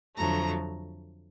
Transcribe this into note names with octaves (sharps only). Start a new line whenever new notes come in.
F2 D3 F#3 A3 A#5